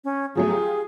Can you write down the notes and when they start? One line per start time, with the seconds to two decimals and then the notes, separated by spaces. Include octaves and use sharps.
0.04 C#4
0.35 F3 F#3 A3 G#4
0.50 F4 G4